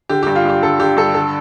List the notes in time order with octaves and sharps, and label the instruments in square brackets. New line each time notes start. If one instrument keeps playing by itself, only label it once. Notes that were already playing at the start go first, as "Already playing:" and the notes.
[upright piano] D3 G4
G2 G4
F4
G2 G4
D3 A4
D3 G4
G2 A4
D3 A4